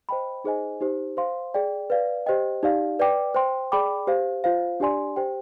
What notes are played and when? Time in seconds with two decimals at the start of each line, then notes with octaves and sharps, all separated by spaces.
0.09 C5 D#5 G5 B5
0.44 D#4 G#4 C5 D#5 G#5
0.81 D#4 G4 C5
1.17 C5 F5 C6
1.54 G#4 D5 G5
1.90 B4 D5 F5
2.26 G4 C5 D#5 G5
2.63 D#4 G4 D5 F5
2.99 B4 D5 G5 D6
3.35 C5 G5 C6
3.72 G#4 D5 G5 B5 D6
4.07 G4 C5 F5
4.44 F4 C5 F5
4.80 D4 G4 D5 G#5 C6
5.16 G4 C5 G5